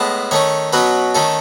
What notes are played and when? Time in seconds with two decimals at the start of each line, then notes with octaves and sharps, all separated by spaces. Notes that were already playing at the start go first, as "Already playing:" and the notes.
Already playing: A2 G#3 B3 A5
0.31 D#3 A3 C#4 C#5
0.73 B2 F#3 C#4 B4
1.15 D#3 A3 C#4 A4